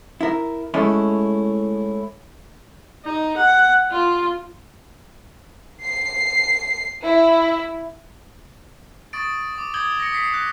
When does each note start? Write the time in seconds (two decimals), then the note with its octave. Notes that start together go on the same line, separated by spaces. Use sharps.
0.21 E4 A#4
0.74 G#3 A3 C#4 E4
3.05 D#4
3.37 F#5
3.91 F4
5.84 C7
7.04 E4
9.13 C#6 D#6 A6 D7
9.55 C#6 D6
9.74 D#6 G6 G#6 F#7 G7
10.00 A#6 C#7
10.12 D#6 B6 C7
10.34 F#6